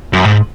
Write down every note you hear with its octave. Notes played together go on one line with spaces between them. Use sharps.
F#2
G#2